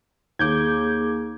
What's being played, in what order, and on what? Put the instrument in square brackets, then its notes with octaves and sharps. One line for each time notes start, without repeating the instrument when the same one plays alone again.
[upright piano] D#2 [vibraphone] A#3 G#4 [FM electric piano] D6 G6 G#6